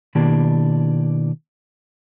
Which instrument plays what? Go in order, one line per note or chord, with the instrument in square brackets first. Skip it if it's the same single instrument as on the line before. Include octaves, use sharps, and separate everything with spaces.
[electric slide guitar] B2 D#3 A#3 D4 E4 G4